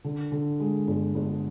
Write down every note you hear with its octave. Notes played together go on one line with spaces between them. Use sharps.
D3
D3
G#3
G1
G1